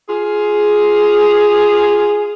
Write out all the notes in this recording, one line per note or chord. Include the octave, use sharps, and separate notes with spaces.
F4 G#4